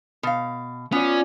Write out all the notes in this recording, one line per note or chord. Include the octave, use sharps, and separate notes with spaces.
B2 F5
B3 C#4 F4 D5